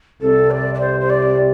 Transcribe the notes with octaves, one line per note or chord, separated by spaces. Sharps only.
C2 C3 G3 C4 A4
D5
D5
C5
C5
D5